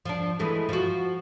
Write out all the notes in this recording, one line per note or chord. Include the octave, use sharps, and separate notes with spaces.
F3 D4
E3 G#3 A3
F3 F#4